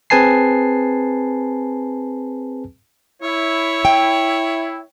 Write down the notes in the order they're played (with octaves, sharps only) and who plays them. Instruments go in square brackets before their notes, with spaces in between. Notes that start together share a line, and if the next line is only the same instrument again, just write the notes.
[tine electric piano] C4 G#4 B4 G#5 A5 C7
[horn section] E4 [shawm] C#5
[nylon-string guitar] G5